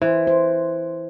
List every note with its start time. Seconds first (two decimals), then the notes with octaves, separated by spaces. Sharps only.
0.02 E3 C5
0.27 C5